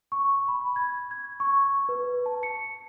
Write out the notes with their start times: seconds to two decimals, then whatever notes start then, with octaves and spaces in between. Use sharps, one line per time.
0.12 C#6
0.48 B5
0.76 G#6
1.11 G#6
1.40 C#6
1.89 B4
2.26 A5
2.43 C#7